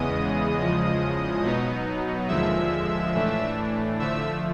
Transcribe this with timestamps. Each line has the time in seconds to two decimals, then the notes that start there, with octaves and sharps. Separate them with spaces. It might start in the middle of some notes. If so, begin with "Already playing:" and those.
Already playing: E2 C#3 E3 G#3 B3 D#5 D#6
0.58 E2 C#3 F3 G#3
1.42 B2 F#3 B3 D#4
2.28 D#2 D3 F3 G#3 E5 E6
3.14 A2 E3 A3 D4
3.99 D3 F3 A3 E5 E6